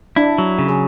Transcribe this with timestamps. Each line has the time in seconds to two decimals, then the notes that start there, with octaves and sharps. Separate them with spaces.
0.16 D4 E4
0.38 F#3
0.59 C#3
0.69 G#4